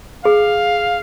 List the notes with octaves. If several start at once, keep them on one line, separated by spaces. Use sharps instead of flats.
G#4 F5